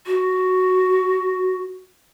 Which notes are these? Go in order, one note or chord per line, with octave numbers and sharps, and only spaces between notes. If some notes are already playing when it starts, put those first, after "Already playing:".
F#4